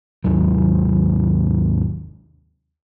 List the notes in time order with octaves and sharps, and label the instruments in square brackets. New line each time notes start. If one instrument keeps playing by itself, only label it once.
[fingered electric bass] G#1 D#2 F#3